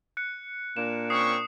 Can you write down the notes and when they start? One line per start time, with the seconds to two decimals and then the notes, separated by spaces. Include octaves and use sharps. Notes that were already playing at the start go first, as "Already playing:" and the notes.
0.17 F#6 C#7
0.77 A#2 A#3 D4 E7
1.10 C4 C#4 C#6 D#6 C7